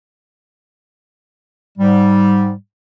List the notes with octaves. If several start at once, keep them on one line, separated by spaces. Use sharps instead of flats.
G#2 G3